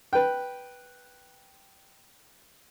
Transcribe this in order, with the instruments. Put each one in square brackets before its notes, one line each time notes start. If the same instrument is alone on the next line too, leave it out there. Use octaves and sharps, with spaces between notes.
[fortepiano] B4 G5